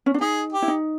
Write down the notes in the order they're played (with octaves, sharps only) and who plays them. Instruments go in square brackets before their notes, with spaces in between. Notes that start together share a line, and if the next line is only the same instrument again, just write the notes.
[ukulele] C#4
D4
[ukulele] D#4 [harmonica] G#4
[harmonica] G4
[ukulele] E4
D#4